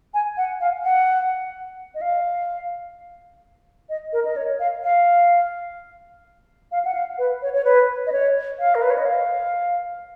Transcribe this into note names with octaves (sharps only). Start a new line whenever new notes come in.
G#5
F#5
F5
F#5
D#5
F5
D#5
A#4
D#5
C#5
F5
F5
F5
F#5
F5
B4
C#5
C#5
B4
D#5
C#5
F5
A#4
B4
C#5
D#5
F5